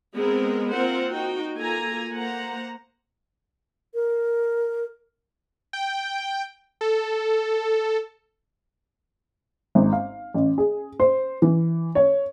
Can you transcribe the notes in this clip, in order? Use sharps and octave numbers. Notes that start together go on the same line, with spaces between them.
G#3 B3 C4 A#4
A#3 C4 F4 A#4 C5 F#5
D#4 F#4 G5
A#3 F4 A4 G#5 A#5
A#3 C5 F#5 A#5
A#4
G5
A4
G#1
F5
A1
G#4
C5
E3
C#5